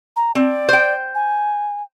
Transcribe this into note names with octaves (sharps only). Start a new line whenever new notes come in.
A#5
C4 D5
C5 G5
G#5